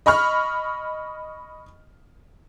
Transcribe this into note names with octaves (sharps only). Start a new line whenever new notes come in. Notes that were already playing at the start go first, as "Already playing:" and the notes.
D#5 B5 C#6 F6